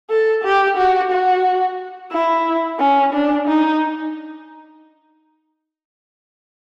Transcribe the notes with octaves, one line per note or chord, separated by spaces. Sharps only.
A4
G4
F#4
F#4
E4
C#4
D4
D#4